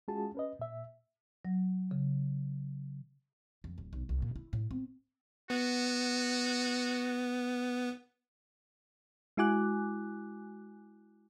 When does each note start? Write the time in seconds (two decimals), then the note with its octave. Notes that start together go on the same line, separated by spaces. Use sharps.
0.08 G#3 C#4 F4 F#4 G#4 A5
0.35 C#4 B4 D#5
0.59 A#2 E5
1.45 F#3
1.91 C#3
3.64 F2
3.78 D1
3.93 B1
4.09 C2
4.22 A#2
4.36 E4
4.53 A2
4.71 C4
5.50 B3 F#4
9.37 G#3 E4 F#4 G#5 D6 F#6